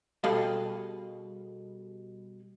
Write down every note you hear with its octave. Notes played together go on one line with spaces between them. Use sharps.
B2 G3 G#4 A4 D#5 F5